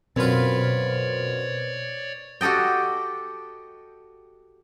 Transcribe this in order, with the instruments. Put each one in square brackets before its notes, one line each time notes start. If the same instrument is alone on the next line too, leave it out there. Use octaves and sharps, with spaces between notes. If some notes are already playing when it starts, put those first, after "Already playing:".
[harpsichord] F#2 F4 [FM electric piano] B2 [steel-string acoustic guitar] C4 B4 [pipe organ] C#5 D5
[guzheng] F#4 G4 A4 D#5 G5